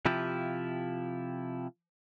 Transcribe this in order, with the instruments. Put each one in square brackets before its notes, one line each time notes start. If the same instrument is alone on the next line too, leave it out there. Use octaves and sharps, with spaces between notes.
[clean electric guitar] C3 F3 E4 F4 G4